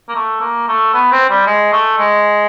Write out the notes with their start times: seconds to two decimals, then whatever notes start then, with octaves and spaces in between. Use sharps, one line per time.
0.09 A#3
0.16 A3
0.41 A#3
0.68 A3
0.94 B3
1.12 C4
1.29 G3
1.47 G#3
1.72 A3
1.98 G#3